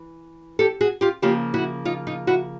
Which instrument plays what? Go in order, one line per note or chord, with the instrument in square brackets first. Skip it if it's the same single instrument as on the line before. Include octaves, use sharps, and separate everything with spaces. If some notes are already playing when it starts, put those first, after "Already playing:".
Already playing: [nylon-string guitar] E3
G4 A4
F#4 G#4
F4 G4
C#3 F3 A#3 F4 G4
E4 F#4
D#4 F4
D#4 F4
E4 F#4